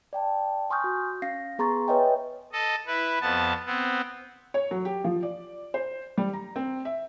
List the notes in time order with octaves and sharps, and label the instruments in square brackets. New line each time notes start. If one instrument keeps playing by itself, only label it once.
[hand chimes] D5 G5 A5
G#5 C6 C#6 D#6 F6 G6
F#4
C#4 F5 A#6 C7
B3 G#4 A#5 C6 C#6 A6
B4 C#5 D#5 E5 G5 G#5
[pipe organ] A4 D#5
E4 B4
F2 B3 A5
B3 C4
[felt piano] C#5
F#3
G4
F3
D5
C5
G3
A#5
C4
E5